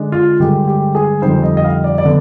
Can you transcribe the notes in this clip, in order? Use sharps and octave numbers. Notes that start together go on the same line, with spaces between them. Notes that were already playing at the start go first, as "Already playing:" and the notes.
Already playing: D3 G#3 D4
F4
G2 D3 G#3 G4
G4
G#4
F2 D3 G3 C4 D#4 C5
D#5
D#5
F5
D5
D5
D3 B3